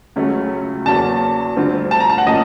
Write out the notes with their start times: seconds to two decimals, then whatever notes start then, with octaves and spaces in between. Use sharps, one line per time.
0.16 C#2 C#3 F#3 A3 C#4
0.86 E2 C#3 F#3 A#3 C#4 A5
1.56 D2 D3 G3 C4 F4
1.91 A5
2.00 A#5
2.10 A5
2.18 F#5
2.26 A2 F3 A#3 C#4 D#5